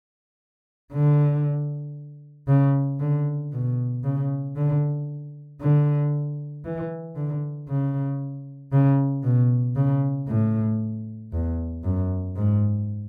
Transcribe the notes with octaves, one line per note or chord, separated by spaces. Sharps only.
D3
C#3
D3
B2
C#3
D3
D3
E3
D3
C#3
C#3
B2
C#3
A2
E2
F#2
G#2